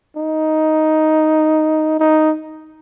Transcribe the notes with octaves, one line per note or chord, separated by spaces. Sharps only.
D#4
D#4